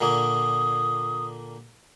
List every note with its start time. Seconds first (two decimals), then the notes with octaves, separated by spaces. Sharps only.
0.01 A#2 D3 A#3 D#6